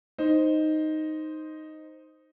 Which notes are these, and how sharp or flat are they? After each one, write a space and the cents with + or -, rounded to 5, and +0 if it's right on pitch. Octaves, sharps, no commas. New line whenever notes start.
D#4 +0 C5 +0